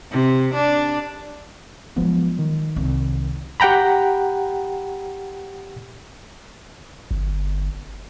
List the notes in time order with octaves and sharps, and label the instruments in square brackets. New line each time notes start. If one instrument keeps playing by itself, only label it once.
[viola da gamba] C3
D4
[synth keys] F3 B3 [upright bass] F#3 G#3
[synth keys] D#3
[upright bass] C2
[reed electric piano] G4 F#5 G5 A#5 B5
[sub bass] G1